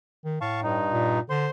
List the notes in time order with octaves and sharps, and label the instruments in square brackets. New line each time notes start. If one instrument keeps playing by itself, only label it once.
[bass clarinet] D#3
[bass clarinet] A2 [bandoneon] F5 A5 C#6
[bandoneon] G2 D#4
[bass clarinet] A#2
[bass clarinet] D3 [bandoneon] C5 C6